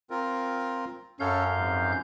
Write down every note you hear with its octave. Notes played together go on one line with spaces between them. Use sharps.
C4 F4 A#4
F#2 C#4 A4 C#5 F5 G6
F2 G#2